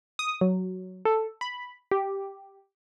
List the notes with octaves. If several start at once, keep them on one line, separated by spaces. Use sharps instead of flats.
D#6
F#3
A4
B5
G4